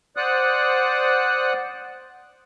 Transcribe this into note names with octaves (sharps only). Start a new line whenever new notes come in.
C5 D5 F#5 D#6 F#6